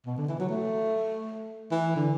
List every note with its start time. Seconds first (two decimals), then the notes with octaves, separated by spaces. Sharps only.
0.06 B2
0.18 D3
0.28 E3
0.40 F#3
0.49 A3
1.71 E3
1.96 D3